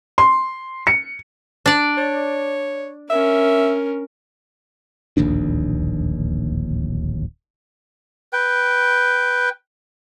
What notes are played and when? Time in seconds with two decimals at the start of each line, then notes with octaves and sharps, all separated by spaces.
0.18 C6
0.87 C#7
1.66 D4 D5
1.97 C#5
3.10 C#4 A#4 E5
5.17 D1 A#1 D#2 D4
8.33 B4 G5